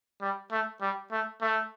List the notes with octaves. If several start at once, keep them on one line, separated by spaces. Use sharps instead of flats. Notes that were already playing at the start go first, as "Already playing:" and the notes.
G3
A3
G3
A3
A3